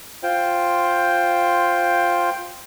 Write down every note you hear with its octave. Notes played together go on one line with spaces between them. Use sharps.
F4 C5 G5